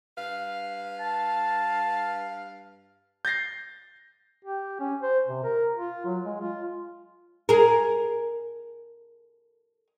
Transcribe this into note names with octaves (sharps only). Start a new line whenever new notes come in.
G2 B4 F5
A5
G6 A6 A#6 C7
G4
C#4
C5
C3
A#4
F4
F#3
G#3
F4
G#4 A#4